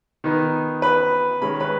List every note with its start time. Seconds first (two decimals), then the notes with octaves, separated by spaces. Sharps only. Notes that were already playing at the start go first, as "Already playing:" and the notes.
0.24 D#3 B3 D#4
0.82 B4 B5
1.41 D#3 G#3 C#4 B5
1.60 B4 B5